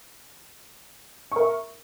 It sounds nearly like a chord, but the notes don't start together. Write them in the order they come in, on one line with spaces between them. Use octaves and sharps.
C#6 A#4 E5